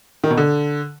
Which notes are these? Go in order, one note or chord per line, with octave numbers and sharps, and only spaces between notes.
D#3
B2
D3